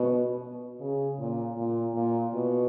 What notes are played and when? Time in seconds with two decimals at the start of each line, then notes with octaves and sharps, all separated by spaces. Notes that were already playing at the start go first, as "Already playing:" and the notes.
Already playing: B2
0.80 C#3
1.19 A#2
1.58 A#2
1.95 A#2
2.33 B2